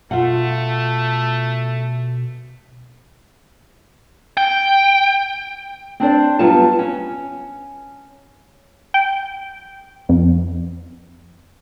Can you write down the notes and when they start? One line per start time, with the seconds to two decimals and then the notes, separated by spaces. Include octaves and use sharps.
0.11 B2 A3 F4 F#5
4.37 G5
6.00 C4 D4 C5 D5
6.39 G2 F#3 G3 B3 F4 A5
6.79 C#4
8.94 G5
10.09 F2